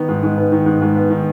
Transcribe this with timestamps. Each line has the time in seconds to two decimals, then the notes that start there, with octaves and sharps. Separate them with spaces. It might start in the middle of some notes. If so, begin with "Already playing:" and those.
Already playing: D#3 B3
0.09 G#2
0.23 G#2
0.37 B3
0.52 D#3
0.66 G#2
0.82 G#2
0.96 B3
1.10 D#3